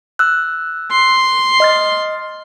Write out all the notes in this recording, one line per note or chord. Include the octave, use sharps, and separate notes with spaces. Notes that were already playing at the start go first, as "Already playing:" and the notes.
E6 F#6
C6
D#5 F6 A6